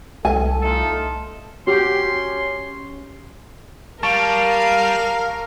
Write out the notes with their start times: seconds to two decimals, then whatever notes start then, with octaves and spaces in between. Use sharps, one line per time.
0.25 C2 A4 G#5
0.62 A3 D#4 F4 A4
1.67 C#4 F#4 G4 C6
4.03 G3 A#4 F5 A5 C#6